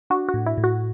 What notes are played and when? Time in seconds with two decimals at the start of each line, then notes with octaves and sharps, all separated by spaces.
0.10 D4 F#4
0.29 F#4
0.34 A2
0.46 E4
0.58 A2
0.64 F#4